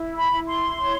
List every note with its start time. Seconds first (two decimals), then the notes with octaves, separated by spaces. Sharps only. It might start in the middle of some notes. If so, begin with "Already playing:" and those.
Already playing: E4
0.16 B5
0.32 E4
0.48 C6
0.79 C#5